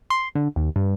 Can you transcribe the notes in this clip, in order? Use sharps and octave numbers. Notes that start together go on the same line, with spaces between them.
C6
D3
D#2
G2